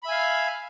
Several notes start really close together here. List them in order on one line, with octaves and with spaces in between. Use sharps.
B5 E5 G#5 F5